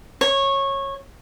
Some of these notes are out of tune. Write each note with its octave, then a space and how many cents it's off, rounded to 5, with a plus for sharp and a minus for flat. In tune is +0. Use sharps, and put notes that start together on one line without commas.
C#5 -15